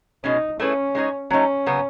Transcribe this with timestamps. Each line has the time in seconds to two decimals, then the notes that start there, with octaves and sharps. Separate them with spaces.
0.24 B2 G#3 C#4 D#4
0.60 A3 C#4 E4 G#4 B4
0.95 G#3 D#4 G#4 C#5
1.30 F#3 A3 C#4 D#4
1.66 C#3 F#3 B3